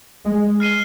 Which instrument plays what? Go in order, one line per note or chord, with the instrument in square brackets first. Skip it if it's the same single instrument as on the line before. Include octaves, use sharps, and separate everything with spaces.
[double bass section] G#3
[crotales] F6 C7 D#7 G7